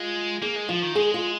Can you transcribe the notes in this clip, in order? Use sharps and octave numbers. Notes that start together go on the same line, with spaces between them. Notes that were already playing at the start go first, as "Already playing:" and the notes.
Already playing: G#3 F4
A#3 G#4
G#3
F3 F4
D#3
G#3 G#4
F4